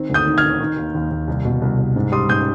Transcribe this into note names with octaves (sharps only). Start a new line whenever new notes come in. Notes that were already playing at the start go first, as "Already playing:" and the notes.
Already playing: D#3 C4
D2
D#6 G6
D#3
F6 G#6
D#3
D#3
D#2
D#2
D#2
C2
B2
C2
C2
G#2
G3 C6 D#6
G#2 D#6 G6